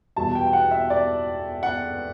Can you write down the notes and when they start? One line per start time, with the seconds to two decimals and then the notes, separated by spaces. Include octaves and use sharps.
0.16 E2 B2 G3 A5
0.35 G5
0.47 G5
0.53 F#5
0.71 E5
0.90 D5
1.63 F#5